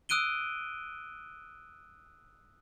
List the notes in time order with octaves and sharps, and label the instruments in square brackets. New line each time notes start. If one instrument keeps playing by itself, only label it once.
[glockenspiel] D#6 E6 F#6 D7 D#7 G7